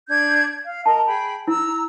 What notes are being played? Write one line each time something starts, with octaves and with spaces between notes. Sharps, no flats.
D4 G6 G#6
F5
A#4 D#5 A5
G#4 G5 B5
E4 A#5 E6